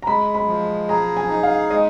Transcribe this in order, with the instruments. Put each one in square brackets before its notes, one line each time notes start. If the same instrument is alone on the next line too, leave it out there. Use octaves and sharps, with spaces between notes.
[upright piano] A#5
[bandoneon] G#3 [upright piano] B5
[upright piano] B5
[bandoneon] F3
[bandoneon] G#4 [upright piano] A#5
[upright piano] G#5
[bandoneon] D#4
[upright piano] F5
[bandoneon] G#3 [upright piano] D#5